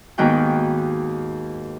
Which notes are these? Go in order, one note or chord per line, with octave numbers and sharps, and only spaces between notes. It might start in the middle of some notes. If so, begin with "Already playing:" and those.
D#2 G#2 D#3 B3 F#4 G5